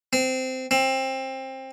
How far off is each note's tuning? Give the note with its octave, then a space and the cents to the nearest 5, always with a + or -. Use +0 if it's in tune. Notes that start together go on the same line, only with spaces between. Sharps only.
C4 -15
C4 +20